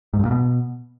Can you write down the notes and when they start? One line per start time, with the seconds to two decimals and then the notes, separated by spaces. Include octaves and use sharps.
0.14 G#2
0.19 G2
0.25 A#2
0.31 B2